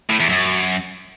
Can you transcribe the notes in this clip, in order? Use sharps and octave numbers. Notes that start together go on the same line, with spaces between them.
A2
E2
F#2